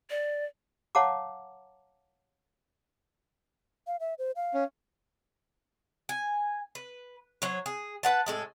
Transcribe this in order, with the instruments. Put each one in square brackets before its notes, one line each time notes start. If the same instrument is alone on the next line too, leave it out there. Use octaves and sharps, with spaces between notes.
[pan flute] D5
[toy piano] C#5 F5 F#5 A5 A#5 D6
[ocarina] F5
E5
C5
F5
[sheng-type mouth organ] C#4
[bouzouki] G#5
B4
F#3 C5 C#5
G#4
B4 F#5 A5
A2 G#3 A4